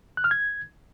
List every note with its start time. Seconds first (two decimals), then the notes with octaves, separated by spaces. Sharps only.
0.17 F#6
0.24 F6
0.31 G#6